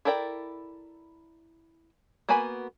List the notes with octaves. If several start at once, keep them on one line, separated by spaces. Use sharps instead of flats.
E4 A4 A#4 D5 G5
A#3 B3 F#4 G#5 B5